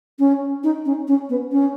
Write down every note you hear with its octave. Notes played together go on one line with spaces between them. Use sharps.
C#4
D#4
C#4
C#4
B3
C#4